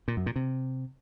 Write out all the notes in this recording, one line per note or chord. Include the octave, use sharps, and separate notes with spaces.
A#2
F#2
A#2
C3